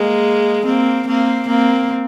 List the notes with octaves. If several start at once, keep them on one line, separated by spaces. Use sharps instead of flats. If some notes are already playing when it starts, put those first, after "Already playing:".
Already playing: G#3 A#3
A#3 C4
A#3 C4
A#3 C4